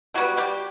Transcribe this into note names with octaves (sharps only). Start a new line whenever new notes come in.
D3 F#3 G3 B3 F#4
G3 G4